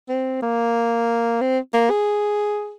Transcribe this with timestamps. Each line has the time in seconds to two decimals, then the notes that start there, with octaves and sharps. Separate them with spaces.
0.09 C4
0.42 A#3
1.41 C4
1.74 A#3
1.90 G#4